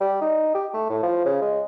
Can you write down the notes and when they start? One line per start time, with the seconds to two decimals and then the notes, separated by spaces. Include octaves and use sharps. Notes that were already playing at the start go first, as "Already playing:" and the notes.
0.01 G3
0.22 D#4
0.54 G4
0.74 A3
0.90 A2
1.03 F3
1.25 C#3
1.42 G#3